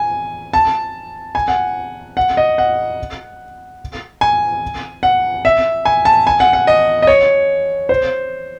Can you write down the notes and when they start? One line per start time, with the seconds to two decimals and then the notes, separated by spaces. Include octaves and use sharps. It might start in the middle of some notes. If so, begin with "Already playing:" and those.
Already playing: G#5
0.53 A5
1.35 G#5
1.48 F#5
2.17 F#5
2.37 D#5
2.58 F#5
4.21 G#5
5.03 F#5
5.45 E5
5.85 G#5
6.05 A5
6.27 G#5
6.40 F#5
6.53 F#5
6.67 D#5
7.02 D#5
7.07 C#5
7.89 C5